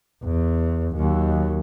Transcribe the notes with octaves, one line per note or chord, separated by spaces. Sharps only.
E2
D#2 F#3